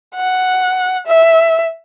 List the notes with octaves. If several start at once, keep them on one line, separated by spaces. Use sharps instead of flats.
F#5
E5